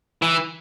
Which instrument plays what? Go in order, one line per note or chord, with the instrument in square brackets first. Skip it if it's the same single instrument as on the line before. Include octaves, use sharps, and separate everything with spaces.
[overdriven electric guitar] E3